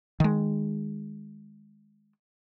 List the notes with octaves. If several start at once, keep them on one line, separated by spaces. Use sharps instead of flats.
D#3 G#3